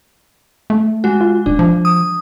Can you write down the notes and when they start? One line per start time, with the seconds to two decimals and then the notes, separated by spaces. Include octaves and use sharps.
0.70 A3
1.04 G#3 F#4
1.21 F4
1.46 D#1 D4
1.59 F3
1.85 D#6